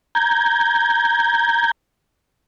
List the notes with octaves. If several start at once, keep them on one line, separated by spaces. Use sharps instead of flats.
A#5 G6 G#6